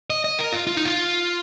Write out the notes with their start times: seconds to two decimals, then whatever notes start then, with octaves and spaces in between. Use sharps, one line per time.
0.10 D#5
0.24 D#5
0.39 A#4
0.52 F4
0.67 F4
0.77 D#4
0.85 F4